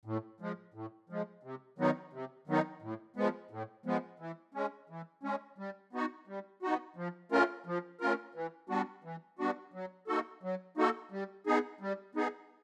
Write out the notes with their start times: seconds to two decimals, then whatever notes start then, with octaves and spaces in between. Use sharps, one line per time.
0.05 A2
0.40 F3 G#3
0.74 A2
1.09 F3 G#3
1.43 C3
1.78 D#3 F#3 B3 D#4
2.13 C3
2.47 D#3 F#3 B3 D#4
2.82 A2
3.16 F3 G#3 B3
3.51 A2
3.86 F3 G#3 B3
4.19 E3
4.54 G#3 C#4
4.89 E3
5.23 G#3 C#4
5.58 G3
5.93 B3 D#4 F#4
6.27 G3
6.63 B3 D#4 F#4
6.96 F3
7.32 A3 C#4 F4 A#4
7.66 F3
8.01 A3 C#4 F4 A#4
8.35 E3
8.69 G3 B3 D4 F#4
9.04 E3
9.39 G3 B3 D4 F#4
9.73 F#3
10.07 A#3 D#4 F#4 A4
10.43 F#3
10.77 A#3 D#4 F#4 A4
11.12 G3
11.47 B3 D#4 G#4
11.81 G3
12.15 B3 D#4 G#4